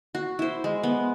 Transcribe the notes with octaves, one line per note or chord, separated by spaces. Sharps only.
F#4
E4 C5
G#3
B3